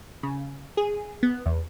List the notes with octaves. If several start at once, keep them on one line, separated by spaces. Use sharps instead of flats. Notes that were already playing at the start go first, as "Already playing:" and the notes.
C#3
G#4
B3
E2